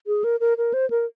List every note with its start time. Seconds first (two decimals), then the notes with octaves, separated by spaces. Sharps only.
0.07 G#4
0.24 A#4
0.40 A#4
0.58 A#4
0.74 C5
0.90 A#4